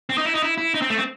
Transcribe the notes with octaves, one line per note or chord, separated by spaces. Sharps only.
C4
D#4
E4
D#4
E4
E4
D#4
C4
A3
C4